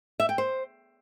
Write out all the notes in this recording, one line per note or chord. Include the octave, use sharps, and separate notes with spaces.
E5
G5
C5